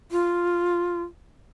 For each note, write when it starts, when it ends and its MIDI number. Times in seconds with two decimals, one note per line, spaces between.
0.11 1.02 65